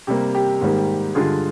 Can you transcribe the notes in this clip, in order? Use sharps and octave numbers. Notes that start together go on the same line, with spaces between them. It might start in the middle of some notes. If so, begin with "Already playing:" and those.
C3 G3 A#3 G4
G4
G#2 D#3 G3 A#3
G2 D3 G#3 F4 G#4